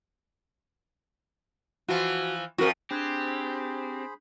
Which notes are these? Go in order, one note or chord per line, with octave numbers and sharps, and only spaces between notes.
E3 F3 F4 F#4
F2 F3 F#4 A#4
C4 D4 G4 G#4 C5 B5 F#6 G#6